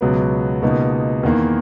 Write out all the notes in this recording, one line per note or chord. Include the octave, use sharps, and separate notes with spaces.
C#2 B2 F#3 B3
C#2 B2 A#3 D#4
E2 D#3 A#3